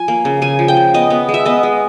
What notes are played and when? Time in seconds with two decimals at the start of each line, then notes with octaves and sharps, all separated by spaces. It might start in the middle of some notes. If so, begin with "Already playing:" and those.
Already playing: F3 G#5
0.08 A#3
0.25 C#3
0.42 C#3 G#5
0.59 F3
0.68 G5
0.77 C#3
0.94 B3 D#5
1.10 B3
1.29 G#3
1.34 E5
1.46 B3 D#5
1.63 G#3